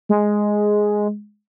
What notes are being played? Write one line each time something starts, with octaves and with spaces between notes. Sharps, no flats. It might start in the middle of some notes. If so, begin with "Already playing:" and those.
G#3